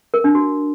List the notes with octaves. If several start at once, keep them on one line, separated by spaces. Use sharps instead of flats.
A#4
D4
F#4